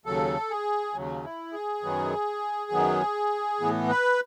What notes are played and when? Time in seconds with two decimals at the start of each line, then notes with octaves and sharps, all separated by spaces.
0.05 D#2 C#3 F#3 A4
0.51 G#4
0.95 D#2 C#3 F#3
1.24 E4
1.53 G#4
1.83 F#2 D#3 F#3 B3
2.71 F#2 D#3 F#3 B3
3.60 A2 E3 B3
3.89 B4